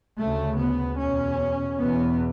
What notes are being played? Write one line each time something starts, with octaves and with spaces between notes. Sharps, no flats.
D2 C#3 A3
B3
E2 B2 C#4
E2 B2 B3